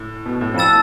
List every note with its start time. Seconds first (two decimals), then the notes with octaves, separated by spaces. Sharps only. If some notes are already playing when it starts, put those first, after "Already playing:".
Already playing: A2
0.26 B2
0.41 A2
0.54 F2
0.58 A5 E6 A6 E7